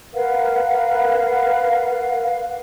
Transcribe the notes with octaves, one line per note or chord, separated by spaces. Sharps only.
A#4 B4 F5 F#5